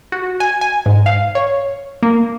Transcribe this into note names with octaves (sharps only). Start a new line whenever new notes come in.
F#4
G#5
G#5
G#2
F5
C#5
A#3